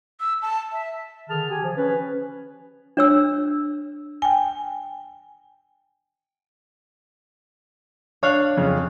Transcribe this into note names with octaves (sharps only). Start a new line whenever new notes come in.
E6
A5
E5
D3 D#3 G#4 A5 F6
G4 G#5
C#3 F3
C#4 B4
D4 C#5 E6
G5 G#5
D4 C#5 F5 F#6
F2 C#3